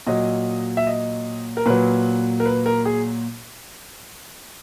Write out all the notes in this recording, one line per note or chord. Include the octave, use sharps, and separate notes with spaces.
A#2 F#3 D#5
E5
D#5
A#4
A#2 F#3 B4
A#4
B4
A#4
G#4